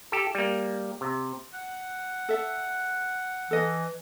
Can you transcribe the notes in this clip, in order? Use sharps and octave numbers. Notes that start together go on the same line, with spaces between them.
G4 A4
G3 A#3
C3
F#5
A4 E5
E3 A4 D#5